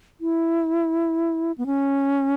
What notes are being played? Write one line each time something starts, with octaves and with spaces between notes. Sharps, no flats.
E4
B3
C#4